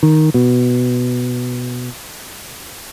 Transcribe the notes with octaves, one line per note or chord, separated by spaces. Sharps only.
D#3
B2